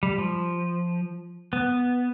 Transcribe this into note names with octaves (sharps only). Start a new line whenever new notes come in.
G3
F3
B3